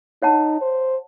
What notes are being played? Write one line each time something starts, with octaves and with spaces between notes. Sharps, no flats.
D#4 C#5 F#5 A5
C5